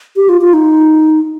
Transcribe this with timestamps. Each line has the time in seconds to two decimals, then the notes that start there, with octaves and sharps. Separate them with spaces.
0.16 G4
0.29 F4
0.41 F4
0.53 D#4